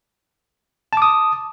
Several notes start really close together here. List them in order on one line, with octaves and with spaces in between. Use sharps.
A5 D6 D#6